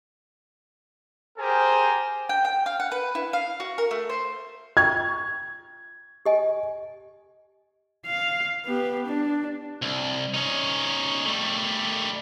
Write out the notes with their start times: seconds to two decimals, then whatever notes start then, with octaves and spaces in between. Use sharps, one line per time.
1.39 G4 G#4 A#4 C5 G#5
2.29 G5
2.45 G5
2.66 F5
2.80 F#5
2.92 B4
3.15 E4
3.33 F5
3.60 F#4
3.78 A#4
3.91 A3
4.10 C5
4.77 F4 G5 C#6 G#6
6.26 G4 D#5 G#5
8.06 F5
8.66 B3 G4
9.07 D4
9.82 C2
10.34 C#4 D#4
11.26 G3 A3